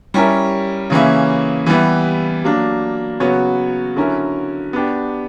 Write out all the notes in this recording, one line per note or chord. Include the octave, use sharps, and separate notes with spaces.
G3 C#4 E4 A#4
C#3 E3 A#3 C#4 E4
E3 G3 B3 E4
F#3 A#3 D4
C#3 F#3 B3 F#4 C#5
D3 F#3 C#4 E4 A#4
B3 D4 G4